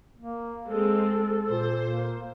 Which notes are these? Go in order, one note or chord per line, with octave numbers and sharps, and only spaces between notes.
A#3
G#3 C4 A4
A#2 C5
A#3